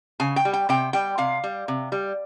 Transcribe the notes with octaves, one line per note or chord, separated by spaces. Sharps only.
C#3 G#5
G5
G3
G5
C3 G5
G3 G5
C3 F5
G3
C3
G3